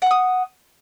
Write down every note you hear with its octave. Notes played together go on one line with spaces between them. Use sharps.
F#5 C#6 D#6